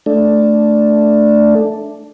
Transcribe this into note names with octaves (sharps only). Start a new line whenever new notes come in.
A3 D4